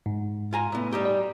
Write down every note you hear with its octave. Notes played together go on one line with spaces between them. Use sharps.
G#2
F4 G#5 A#5
A2 B3
G3 D#4 G4
D5